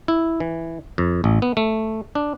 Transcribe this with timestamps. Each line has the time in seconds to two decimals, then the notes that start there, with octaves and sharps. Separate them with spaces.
0.08 E4
0.40 E3
0.98 F2
1.24 A1
1.42 B3
1.57 A3
2.15 D4